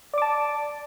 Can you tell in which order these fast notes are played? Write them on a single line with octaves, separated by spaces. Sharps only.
D5 D6 A5